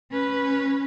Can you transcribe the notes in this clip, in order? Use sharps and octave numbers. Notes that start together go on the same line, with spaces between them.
C#4 B4